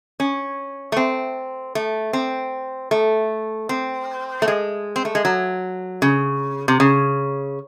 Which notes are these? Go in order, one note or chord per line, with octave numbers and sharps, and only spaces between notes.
C#4
A3
C4
A3
C4
A3
C4
A3
G#3
C4
A3
G#3
F#3
C#3
C3
C#3